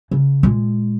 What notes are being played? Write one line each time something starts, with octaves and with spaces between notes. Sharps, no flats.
C#3
A#2 G#3